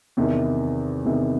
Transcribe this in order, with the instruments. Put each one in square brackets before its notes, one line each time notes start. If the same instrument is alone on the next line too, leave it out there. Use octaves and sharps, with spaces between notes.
[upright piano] E2 C3 D#3
E2 C3 D#3